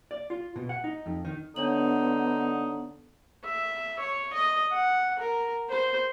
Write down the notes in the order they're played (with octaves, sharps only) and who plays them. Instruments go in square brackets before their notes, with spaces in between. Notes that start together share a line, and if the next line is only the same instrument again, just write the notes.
[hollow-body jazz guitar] D5
F4
B2
F#5
D#4
F2
D#3
[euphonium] D3 [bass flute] B3 [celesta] D4 C#5 F#7 [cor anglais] D#4
[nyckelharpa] E5
C#5
D#5
F#5
A#4
C5